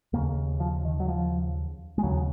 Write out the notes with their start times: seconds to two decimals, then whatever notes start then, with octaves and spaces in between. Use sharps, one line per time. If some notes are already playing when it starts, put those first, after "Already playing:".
0.13 D#2 C#3 A#3
0.60 F3
0.85 D#3
1.00 F#3
1.08 F3
1.98 G#3
2.03 D#2 C#3 F#3